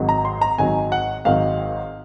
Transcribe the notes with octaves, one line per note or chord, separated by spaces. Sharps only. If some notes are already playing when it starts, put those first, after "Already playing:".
Already playing: G#1 G#2 D#3 F#3
A#5
C6
A#5
G#1 G#2 D#3 F#3 G#5
F#5
G#1 G#2 D#3 F#3 F5